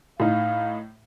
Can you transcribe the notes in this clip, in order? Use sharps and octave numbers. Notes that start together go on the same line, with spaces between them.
A2 D#4 F5